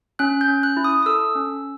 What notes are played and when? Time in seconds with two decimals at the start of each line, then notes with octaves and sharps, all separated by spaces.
0.19 C#4 F#6
0.41 G6
0.48 C#4
0.63 F#6
0.77 E4
0.84 D#6
1.02 D#6
1.06 A4 E6
1.35 C#4